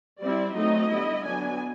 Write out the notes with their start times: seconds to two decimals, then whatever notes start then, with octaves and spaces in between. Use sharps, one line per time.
0.20 G3 C4 E4 D5
0.55 F#3 A3 C4 D#4 D#5
0.90 D3 G3 B3 E4
1.25 F#3 B3 D4 G#5